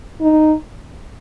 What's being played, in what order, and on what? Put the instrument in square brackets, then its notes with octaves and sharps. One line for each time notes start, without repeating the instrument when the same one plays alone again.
[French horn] D#4